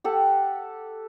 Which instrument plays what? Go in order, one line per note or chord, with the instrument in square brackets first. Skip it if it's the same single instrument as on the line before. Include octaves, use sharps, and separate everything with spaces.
[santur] G4 A4 F#5